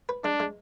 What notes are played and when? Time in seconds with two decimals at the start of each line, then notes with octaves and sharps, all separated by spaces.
0.09 B4
0.24 G#3 D4
0.40 G#3